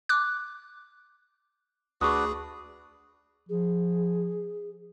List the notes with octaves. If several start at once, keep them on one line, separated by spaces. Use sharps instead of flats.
D6 F#6
D2 D4 F#4 G#4 B4 C#6 D#6
F3 G#4